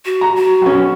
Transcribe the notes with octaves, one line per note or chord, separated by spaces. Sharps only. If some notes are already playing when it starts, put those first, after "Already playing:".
F#4
A#5
F#4
B1 C#4